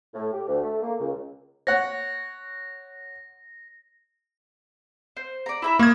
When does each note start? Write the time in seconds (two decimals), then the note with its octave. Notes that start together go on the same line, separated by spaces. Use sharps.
0.14 A2
0.33 G4
0.47 D2
0.63 A3
0.82 A#3
0.99 C#2
1.67 C#5 F#5 A#6
5.17 C5
5.46 D5 A#5
5.62 E4 E5 B5
5.79 A#3 C#6 D#6 G#6